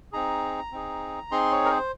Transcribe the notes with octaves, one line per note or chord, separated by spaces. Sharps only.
C4 D#4 G#4 A#5
C4 D#4 G#4
C4 D#4 G#4 C6
C#5
A#4
C5